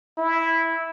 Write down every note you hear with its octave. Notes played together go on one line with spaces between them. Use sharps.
E4